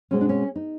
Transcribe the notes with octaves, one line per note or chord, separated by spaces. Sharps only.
B2 G#3 C4 C#4
D4
C#4
D#4